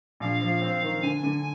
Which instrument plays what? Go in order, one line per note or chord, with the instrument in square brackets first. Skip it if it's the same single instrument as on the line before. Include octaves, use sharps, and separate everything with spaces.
[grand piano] A#1 [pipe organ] F5
[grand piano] F3
C4
D#3
[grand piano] D3 [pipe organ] G#5
[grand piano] D3